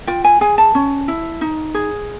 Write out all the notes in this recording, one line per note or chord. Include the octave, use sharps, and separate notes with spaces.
F4 G5
G#5
G#4 G#5
A5
C#4
E4
D#4
G#4